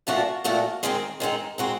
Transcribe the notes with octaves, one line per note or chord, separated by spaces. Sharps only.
A#2 F3 A3 D4 F#4
A#2 F3 A3 D4 F#4
D#3 G#3 C4 D#4
D#3 G#3 C4 D#4
G#3 C4 D#4 F#4